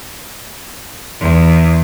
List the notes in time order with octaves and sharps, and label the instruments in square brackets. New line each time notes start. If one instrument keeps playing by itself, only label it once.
[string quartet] E2